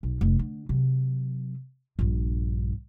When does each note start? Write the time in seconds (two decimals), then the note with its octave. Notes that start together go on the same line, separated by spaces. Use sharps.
0.03 B1
0.21 F1
0.39 D3
0.69 C3 F#3
1.99 A#1 G2